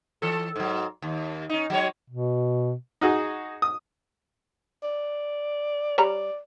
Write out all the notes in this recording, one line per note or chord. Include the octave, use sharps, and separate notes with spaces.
E3 A4
G#2 F#3
D#2
C#4 D#4
F#3 G#3 C#5
B2
D#4 F#4 G#4 D#5
D#6
D5
G3 C#5 D5 A#5